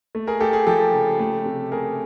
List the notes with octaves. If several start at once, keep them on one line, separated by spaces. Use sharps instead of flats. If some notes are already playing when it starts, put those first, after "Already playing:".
A3
G#4 A#4
A3 G4 A4
G#4
F3 G4 A4
C#3
A3
C3
A3 G#4 A#4